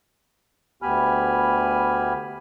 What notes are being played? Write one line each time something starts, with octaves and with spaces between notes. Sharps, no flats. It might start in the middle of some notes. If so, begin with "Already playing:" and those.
D2 B3 G4 G#5 B5 F6